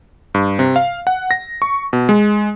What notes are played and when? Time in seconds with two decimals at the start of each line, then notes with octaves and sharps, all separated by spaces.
0.34 G2
0.59 C3
0.76 F5
1.07 F#5
1.31 A#6
1.62 C#6
1.93 B2
2.09 G#3